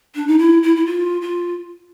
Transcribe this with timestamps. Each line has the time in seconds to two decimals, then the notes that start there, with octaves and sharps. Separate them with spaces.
0.15 D4
0.28 D#4
0.38 E4
0.63 E4
0.76 E4
0.86 F4
1.22 F4